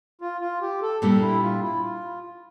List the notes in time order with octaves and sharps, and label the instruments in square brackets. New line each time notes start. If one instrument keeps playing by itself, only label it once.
[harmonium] F4
F4
G4
A4
[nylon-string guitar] A#2 G3 A#3 D4 G4 [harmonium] A4
[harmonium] E4
F4
E4
F4